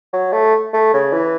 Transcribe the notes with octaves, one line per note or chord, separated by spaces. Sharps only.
F#3
A3
A3
C#3
E3